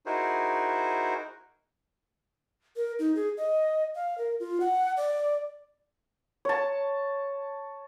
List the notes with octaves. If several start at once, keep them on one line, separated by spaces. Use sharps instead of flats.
D#4 E4 F#4 G#4 A#4 C5
A#4
D#4
G#4
D#5
F5
A#4
F4
F#5
D5
C#5 A5